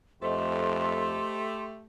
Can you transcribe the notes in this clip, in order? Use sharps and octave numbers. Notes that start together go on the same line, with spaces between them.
F2 A3 G4 C5 D#5 C6